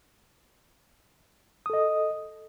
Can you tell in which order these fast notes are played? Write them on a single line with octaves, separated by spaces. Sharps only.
D#6 A4 D#5